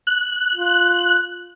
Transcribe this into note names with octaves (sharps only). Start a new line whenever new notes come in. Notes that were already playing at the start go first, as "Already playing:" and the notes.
F#6
F4